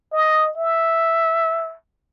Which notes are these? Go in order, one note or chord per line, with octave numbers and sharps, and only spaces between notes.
D#5
E5